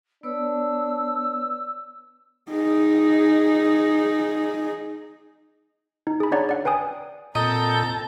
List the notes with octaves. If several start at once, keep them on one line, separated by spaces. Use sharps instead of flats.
B3 D4 B4 C#5 E6
D#4 G#4
D#4
G#4 B5
D4 C#5 D5 F#5 A#5
D5 F#5
B4 G5 G#5 D#6
A#2 C4 A4 D#5 A5 A#5 G6